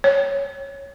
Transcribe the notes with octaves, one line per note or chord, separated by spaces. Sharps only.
C#5